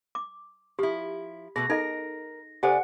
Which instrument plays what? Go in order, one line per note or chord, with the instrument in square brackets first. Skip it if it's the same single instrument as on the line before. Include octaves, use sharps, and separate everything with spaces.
[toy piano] D6
[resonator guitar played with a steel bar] F3 E4 [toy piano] G4
[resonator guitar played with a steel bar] B2 A3 B4 [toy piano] G#4 [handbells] A#6
[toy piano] D#4 A4 D#5 [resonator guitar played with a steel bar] A#4
[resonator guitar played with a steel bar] C#3 D5 G#5 [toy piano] G4 A4 C5 [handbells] F#5